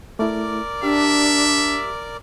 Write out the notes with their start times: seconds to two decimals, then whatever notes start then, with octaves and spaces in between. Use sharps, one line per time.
0.19 A3 E4 A#4 D5 D6
0.83 D4 G4 E5